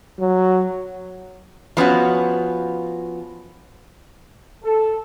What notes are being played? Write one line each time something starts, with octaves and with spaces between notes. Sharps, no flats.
F#3
F3 B3 C#4 F#4
A4